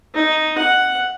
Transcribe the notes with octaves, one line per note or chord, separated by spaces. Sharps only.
D#4
F#5